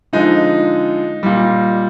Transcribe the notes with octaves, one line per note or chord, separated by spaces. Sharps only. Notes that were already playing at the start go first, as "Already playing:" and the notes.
D3 F3 G#3 D#4
A#2 G3